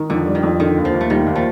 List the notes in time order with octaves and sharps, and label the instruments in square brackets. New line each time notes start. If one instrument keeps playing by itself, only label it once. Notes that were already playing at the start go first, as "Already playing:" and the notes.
Already playing: [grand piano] D#3
[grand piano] F2 [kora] D3
[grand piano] G3
[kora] D#3
[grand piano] F2
[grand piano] D3 [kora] D#3
[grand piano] D#2
[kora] F3
[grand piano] D#2
[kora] A3
[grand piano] D#2 [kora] D#3 G3
[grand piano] D#2
[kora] F3 A3